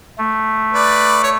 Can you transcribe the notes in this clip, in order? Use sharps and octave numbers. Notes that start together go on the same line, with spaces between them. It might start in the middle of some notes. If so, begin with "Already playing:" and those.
A3
B4 D5
C#5